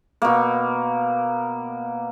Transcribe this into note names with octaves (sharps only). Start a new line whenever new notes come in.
B2 A#3